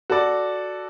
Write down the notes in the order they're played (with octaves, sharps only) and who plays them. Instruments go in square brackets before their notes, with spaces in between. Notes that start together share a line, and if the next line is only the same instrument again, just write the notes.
[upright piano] F#4 A4 D5